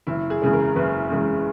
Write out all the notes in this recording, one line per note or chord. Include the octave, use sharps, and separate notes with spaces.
F#1 E4
G#4
E2 C#3 G#3
A#4
F#1 B4
E2 C#3 G#3